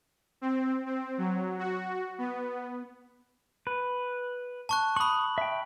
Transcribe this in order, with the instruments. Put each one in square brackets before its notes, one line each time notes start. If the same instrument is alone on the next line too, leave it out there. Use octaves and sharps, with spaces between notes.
[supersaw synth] C4
C4
F#3
F#4
B3
[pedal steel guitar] B4
[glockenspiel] A5 C#6 F#6
[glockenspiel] B5 F#7 [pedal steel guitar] C#6 D#6
[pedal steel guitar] E5 G5